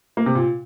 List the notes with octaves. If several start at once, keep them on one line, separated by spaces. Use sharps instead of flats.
A#3
C3
A#2